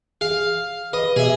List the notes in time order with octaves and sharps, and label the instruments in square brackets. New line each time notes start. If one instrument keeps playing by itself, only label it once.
[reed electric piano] G#4 [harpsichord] F5
[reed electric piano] B4 [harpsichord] D#5
[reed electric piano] B2 [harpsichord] G#4 E5